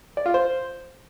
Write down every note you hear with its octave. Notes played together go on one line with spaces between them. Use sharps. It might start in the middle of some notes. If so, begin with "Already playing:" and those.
D5
F4
C5